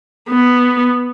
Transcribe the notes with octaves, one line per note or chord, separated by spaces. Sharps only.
B3